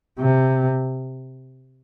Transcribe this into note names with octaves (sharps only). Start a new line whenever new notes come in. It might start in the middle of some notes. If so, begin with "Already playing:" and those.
C3